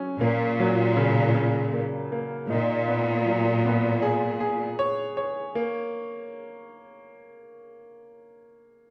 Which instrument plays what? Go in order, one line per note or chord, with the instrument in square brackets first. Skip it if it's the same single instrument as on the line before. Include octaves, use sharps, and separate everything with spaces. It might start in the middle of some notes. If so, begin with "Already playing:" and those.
Already playing: [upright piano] F#3 C#4
[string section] A#2 [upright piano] A#3
[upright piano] F#3
C#3
C#3
A#3
A#3
[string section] A#2 [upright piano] D#4
[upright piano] B3
F#3
B3
G#4
G#4
C#5
C#5
A#3